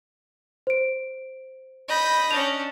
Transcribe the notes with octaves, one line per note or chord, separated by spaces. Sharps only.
C5 D7
D#5 B5 G6
C#4 D4 F7